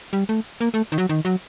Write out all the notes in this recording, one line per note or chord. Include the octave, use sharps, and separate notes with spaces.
G3
A3
A#3
A3
D#3
F#3
D#3
F#3